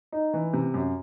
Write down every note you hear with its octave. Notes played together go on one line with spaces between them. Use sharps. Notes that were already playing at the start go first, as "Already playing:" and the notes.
D#4
E3
C3
F#2